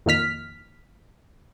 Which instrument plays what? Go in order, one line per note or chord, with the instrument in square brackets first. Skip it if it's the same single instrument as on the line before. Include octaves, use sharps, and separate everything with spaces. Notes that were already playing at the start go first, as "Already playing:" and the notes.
[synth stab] F2 A#2 D#3 F6 B6